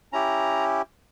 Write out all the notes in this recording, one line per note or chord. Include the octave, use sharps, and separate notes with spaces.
C#4 E4 G4 A#5